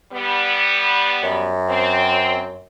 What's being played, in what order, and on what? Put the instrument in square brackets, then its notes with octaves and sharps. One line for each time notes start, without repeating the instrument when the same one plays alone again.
[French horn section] G3 B3
[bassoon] F#2
[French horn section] C4